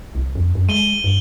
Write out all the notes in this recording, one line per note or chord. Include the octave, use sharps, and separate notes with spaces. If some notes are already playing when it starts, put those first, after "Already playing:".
C2
F2
F#2
G#3 D#7 G7
G2